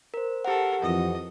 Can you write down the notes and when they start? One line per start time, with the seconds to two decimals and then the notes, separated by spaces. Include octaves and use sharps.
0.14 A#4 C5
0.45 G4 A4 A#4 F#5
0.82 F2 E3 D#5